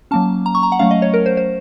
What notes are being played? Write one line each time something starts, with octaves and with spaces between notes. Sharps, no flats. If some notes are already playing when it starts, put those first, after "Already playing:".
F#3 A#3 C#4 A5
A#5
C#6
A#5
F#5
F#3 A3 C#4 F5
D#5
C#5
A#4
C5
C5